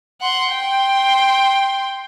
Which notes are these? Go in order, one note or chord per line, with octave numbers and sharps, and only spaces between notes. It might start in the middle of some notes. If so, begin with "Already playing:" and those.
F#5 C6
G5 C6